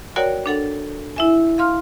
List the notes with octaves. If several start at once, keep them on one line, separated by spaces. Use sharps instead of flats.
F#4 A#4 C#5 D5 F#5 G5
D4 A4 F#5
E4 E5 G#5
F5 C6 F6